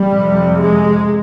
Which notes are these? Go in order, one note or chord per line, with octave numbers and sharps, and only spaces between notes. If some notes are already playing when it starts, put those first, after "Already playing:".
Already playing: G3
F2 C3
G#3